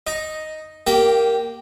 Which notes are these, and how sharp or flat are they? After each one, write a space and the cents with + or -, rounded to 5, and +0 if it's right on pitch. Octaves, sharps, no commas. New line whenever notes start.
D#4 +0 D#5 +0
A#3 -5 G4 +0 G5 -25